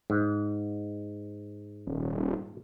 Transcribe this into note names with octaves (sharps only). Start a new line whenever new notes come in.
G#2
D#1